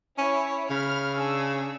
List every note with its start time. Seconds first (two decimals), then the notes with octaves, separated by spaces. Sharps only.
0.18 C#4 E4 C#5
0.70 C#3 B5 F6
1.14 D4 G#4 E6